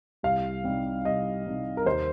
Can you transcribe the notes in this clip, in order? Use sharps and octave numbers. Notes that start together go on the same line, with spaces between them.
C2 F5
C3 G3 D#4
C2 D#5
C3 G3 D#4
A#4
D#2 C5